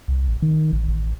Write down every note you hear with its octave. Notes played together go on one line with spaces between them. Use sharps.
C2
A1
D#3
A1
A1